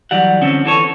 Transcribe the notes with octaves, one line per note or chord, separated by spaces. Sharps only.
E3 F#3 G3 F#5
D3 F3 C4 C#4
E3 A4 C#5